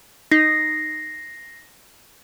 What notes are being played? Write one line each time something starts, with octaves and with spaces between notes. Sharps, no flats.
D#4 A#6 C7